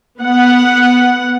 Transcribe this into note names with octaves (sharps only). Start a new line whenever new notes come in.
B3 F#5